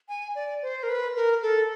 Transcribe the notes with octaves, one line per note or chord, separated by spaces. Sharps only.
G#5
D5
C5
A#4
B4
A#4
A4